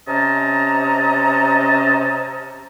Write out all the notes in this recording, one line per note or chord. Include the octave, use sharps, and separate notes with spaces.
C3 C#4 C#5 D#5 A5 A#5